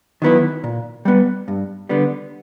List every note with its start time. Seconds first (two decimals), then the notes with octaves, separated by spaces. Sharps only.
0.22 D#3 F#3 B3 E4
0.64 A#2
1.05 G3 B3
1.48 G2
1.89 D3 G3 B3